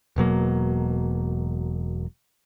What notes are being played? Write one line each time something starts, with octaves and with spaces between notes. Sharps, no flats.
E1 B2 F#3 A#3